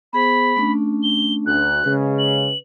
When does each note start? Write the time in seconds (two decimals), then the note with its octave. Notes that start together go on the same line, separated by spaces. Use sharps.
0.13 B3 G#4 C5 B5
0.56 A3 C#4 D4
1.03 G7
1.46 D2 F#6
1.84 C#3 G#3 B4
2.19 F#7